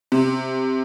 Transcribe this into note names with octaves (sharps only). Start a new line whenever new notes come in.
C3